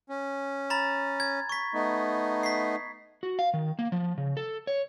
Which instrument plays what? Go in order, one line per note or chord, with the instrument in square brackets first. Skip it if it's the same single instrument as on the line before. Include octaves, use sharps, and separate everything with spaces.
[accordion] C#4
[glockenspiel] A#5 B5 A6
G#6
C#6 B6
[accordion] A3 B3 D#4
[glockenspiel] B6 C7
[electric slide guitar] F#4
F5
D#3
A#3
F3
C#3
A4
C#5